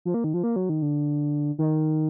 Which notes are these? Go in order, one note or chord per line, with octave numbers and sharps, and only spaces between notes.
F3
A#3
D#3
F3
A#3
F#3
D#3
D3
D#3